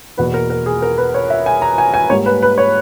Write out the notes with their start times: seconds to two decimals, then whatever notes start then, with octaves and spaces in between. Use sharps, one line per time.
0.18 E2 B2 A#3 B4
0.34 A#4
0.50 A#4
0.66 G#4
0.82 A#4
0.98 B4
1.15 C#5
1.30 E5
1.46 G#5
1.62 A#5
1.78 G#5
1.94 G#5
2.10 G#2 G3 A#3 C#5
2.26 B4
2.42 B4
2.58 C#5